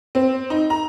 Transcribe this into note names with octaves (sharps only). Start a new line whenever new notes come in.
C4
D#4
A#5